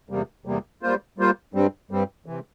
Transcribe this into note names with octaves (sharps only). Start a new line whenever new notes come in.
E2 C3 G3 A#3
E2 C3 G3 A#3
G3 A#3 F4 C5
G3 A#3 F4 C5
G2 G3 C4
G2 G3 C4
C3 E3